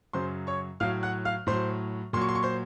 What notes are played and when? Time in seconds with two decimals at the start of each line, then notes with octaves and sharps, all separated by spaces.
0.13 F#2 C#3 F#3 C5 C6
0.47 C#5 C#6
0.80 A2 F#3 F5 F6
1.03 F#5 F#6
1.25 F5 F6
1.47 A2 F#3 C5 C6
2.13 A#2 C6
2.16 F#3 C#6
2.29 C6
2.35 C#6
2.43 C5 C6